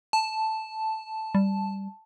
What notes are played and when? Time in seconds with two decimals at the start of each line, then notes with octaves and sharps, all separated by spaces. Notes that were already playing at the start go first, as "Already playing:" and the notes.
0.13 A5
1.35 G3